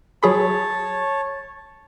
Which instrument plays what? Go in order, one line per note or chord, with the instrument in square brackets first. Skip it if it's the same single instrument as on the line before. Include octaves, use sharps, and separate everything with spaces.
[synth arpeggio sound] F#3 G#4 B5 [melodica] C#5 A5